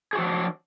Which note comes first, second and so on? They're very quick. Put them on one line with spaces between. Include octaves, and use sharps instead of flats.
G#4 F#4 F3 F#3 D4